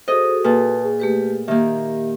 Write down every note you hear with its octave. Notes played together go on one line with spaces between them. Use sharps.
F#4 G#4 A4 C5 D#5
A#2 B4 A5
G#4
A3 G4 B4
D#3 A#3 G4 E5